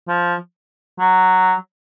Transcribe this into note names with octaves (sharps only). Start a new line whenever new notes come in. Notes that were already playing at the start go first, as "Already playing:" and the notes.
F3
F#3